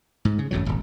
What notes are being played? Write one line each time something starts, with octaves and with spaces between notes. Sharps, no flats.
G#2
C#3
G#1 F#2 A2 F#3
D#1 G#1